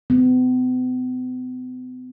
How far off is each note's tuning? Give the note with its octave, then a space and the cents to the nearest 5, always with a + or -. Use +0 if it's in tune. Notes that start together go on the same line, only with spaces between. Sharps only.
B3 +45